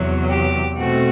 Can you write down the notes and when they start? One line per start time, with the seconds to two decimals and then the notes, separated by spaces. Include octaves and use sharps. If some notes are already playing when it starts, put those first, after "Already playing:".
Already playing: E2 C3 F#3
0.30 G4
0.77 B2 A3 C4 F#4